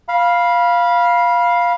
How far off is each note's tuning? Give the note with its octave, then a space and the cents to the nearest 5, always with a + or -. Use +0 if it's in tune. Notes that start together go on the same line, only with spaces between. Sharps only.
F5 +0 B5 -20